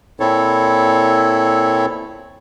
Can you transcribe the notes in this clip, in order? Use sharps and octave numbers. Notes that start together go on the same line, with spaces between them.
A#2 C4 E4 A4 C#5